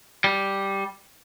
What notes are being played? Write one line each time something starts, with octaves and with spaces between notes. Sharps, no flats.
G3